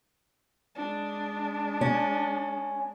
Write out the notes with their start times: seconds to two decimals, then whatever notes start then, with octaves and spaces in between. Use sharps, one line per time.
0.76 G#3 D4
1.81 C#4